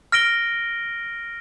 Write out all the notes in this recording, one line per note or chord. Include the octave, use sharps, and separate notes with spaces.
F6 A#6 D7 G7